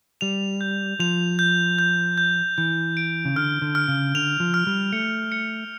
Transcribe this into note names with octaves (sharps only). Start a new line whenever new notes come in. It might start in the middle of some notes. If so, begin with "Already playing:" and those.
G3 F7
G6
F3 F7
G6
G6
G6
E3 G6
D7
C#3
D3 F6
D3
F6
C#3
D3 F7
F3
F6
G3
A3 C#7
C#7